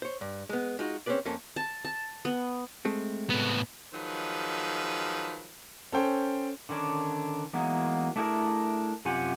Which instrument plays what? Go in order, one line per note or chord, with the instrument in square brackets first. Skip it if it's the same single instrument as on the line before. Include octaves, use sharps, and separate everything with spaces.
[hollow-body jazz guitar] C5 C#5
G2
G#3 B3
G#3 D#4 F4 F#4
C4 C#4 D#4 G#4 B4 D5
F2 A#3 C#4 A4
[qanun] A5
A5
B3
[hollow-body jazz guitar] G#3 A3 C4
[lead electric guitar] A2 B3
[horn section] D#3 F3 F#3 G#3 B4
[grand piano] C#4 A4 C5 G5
[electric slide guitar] D3 D#3 C#4 D4
E3 F#3 G#3 A#3 B3 D#4
A3 D4 E4 G4 G#4 A#4
F#2 C3 F4 G4 F#5 G#5